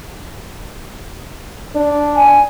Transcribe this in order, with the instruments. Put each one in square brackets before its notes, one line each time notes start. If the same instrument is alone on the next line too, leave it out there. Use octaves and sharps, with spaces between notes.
[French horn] D4
[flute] G#5